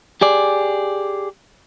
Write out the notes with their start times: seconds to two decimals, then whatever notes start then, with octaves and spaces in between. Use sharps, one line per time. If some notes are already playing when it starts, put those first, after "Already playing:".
0.21 G4 G#4 D5